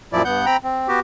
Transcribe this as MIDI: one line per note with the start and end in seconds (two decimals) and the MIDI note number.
0.13 0.23 42
0.13 0.23 46
0.13 0.23 53
0.13 0.23 64
0.13 0.23 74
0.25 0.46 43
0.25 0.46 59
0.25 0.46 78
0.25 0.46 91
0.46 0.57 60
0.46 0.57 79
0.46 0.57 82
0.46 0.57 83
0.64 0.88 60
0.88 1.00 59
0.88 1.00 66
0.88 1.00 67